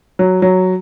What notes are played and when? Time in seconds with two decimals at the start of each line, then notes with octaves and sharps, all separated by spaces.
0.19 F#3
0.42 F#3